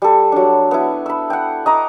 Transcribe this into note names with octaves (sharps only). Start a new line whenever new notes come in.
G3 A4
F#3 D4
B3 E4
B5 E6
F#5 G5
D#5 A#5 D6